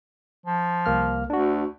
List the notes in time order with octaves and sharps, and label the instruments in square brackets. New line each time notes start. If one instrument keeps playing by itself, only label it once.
[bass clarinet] F3
[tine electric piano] C2 A#3 F6
[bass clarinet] D2 [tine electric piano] D4 F#4